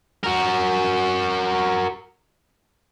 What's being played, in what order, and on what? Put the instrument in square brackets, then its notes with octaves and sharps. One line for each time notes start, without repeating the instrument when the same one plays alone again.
[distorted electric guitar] F#4 A#4